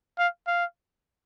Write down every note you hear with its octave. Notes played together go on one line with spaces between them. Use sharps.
F5
F5